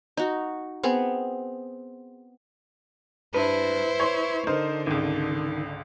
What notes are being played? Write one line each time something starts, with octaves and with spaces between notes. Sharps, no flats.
D#4 F#4
B3 C4 G#4
G2 E4 B4 C5
C#5 C6 C#6
D3 D#4 A#4 C5
G#1 C#2 D#3